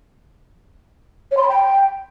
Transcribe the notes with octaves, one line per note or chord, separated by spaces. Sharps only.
C#5
C6
B5
G5